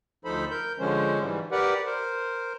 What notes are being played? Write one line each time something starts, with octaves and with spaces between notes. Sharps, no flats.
D2 F3 D#4 A4 C5 B5
A#4 G6
D3 F3 G#3 C#4 C5
G#2 E3 G3
G4 A#4 B4 D5 F#5
A#4 C5